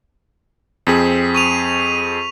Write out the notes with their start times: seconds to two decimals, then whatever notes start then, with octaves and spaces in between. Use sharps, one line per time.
0.87 F2 C4 G#4 B6
1.35 C#6 D#7 F7